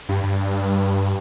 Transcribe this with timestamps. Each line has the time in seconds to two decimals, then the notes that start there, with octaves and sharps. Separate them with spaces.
0.09 G2
0.24 G2